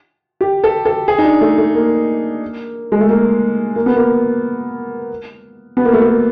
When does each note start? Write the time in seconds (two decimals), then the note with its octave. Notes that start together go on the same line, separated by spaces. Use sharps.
0.41 G4
0.64 A4
0.85 A4
1.08 G#4
1.18 D#4
1.24 D4
1.41 A3
1.58 A3
1.75 A#3
2.92 G#3
3.01 A3
3.09 A#3
3.76 A#3
3.86 B3
3.96 A#3
5.77 B3
5.85 A#3
5.93 A3
6.02 A#3